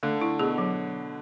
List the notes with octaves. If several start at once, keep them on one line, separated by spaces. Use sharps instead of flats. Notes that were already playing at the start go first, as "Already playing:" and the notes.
D3 A3
E4
B2 G#4
F#3